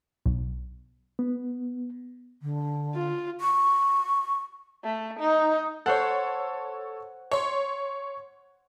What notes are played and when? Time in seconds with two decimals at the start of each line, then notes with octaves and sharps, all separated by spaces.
0.26 B1
1.19 B3
2.42 D3
2.95 F4
3.41 C#6
4.84 A3
5.19 D#4
5.86 A4 C5 C#5 F#5
7.31 C#5 C6